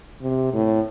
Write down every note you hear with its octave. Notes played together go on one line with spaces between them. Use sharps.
C3
A2